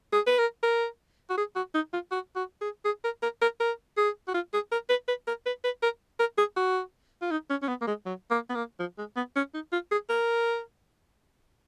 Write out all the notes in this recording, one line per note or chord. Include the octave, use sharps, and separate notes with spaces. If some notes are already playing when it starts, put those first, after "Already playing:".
G#4
B4
A#4
A#4
F#4
G#4
F#4
D#4
F4
F#4
F#4
G#4
G#4
A#4
A#4
A#4
A#4
G#4
F#4
F4
G#4
A#4
B4
B4
A#4
B4
B4
A#4
A#4
G#4
F#4
F4
D#4
C#4
C#4
B3
A#3
G#3
F#3
A#3
B3
A#3
F3
G#3
B3
C#4
D#4
F4
G#4
A#4